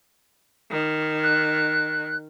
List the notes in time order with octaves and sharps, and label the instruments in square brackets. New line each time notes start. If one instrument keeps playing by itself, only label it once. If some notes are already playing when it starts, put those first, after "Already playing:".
[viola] D#3
[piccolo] F#6